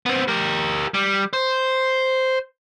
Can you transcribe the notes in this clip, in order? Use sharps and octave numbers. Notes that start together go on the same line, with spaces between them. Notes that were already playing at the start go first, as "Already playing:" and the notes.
B3 C4
G4 A#4
G3
C5